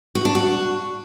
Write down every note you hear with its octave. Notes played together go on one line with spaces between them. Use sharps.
F#4
D4
F#4